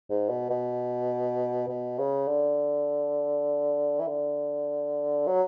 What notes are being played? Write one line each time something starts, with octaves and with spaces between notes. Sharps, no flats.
G#2
B2
B2
B2
C#3
D3
E3
D3
F#3